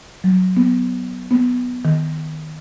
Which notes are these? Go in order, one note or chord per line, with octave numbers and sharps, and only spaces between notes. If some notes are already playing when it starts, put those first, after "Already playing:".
F#3
B3
B3
D#3